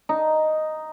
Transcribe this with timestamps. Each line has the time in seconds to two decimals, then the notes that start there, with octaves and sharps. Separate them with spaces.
0.09 D#4